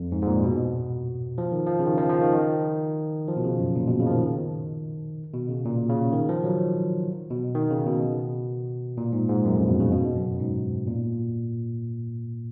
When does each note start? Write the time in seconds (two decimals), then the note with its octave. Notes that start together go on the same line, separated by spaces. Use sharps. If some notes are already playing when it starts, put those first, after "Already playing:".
Already playing: F2
0.12 G#2
0.22 G#2
0.27 A#2
0.44 B2
1.38 F3
1.52 D#3
1.67 F3
1.79 C#3
1.85 D#3
1.98 F3
2.09 F3
2.22 D#3
2.33 D#3
3.28 F3
3.37 B2
3.44 C#3
3.60 F#2
3.76 A#2
3.88 B2
4.00 C#3
4.07 F3
4.11 D#3
5.33 B2
5.49 C#3
5.65 A#2
5.89 C#3
6.13 D#3
6.29 F3
6.44 F#3
7.31 B2
7.55 D#3
7.70 C#3
7.87 B2
8.98 A#2
9.12 G#2
9.29 G#2
9.45 F#2
9.56 F2
9.68 B2
9.80 C#3
9.92 B2
10.16 F#2
10.39 G#2
10.87 A#2